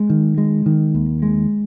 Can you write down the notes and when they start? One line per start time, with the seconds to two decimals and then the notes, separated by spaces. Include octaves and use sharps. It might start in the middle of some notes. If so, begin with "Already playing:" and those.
Already playing: G#3
0.10 D#3
0.38 G#3
0.66 D#3
0.95 D#2
1.22 G#3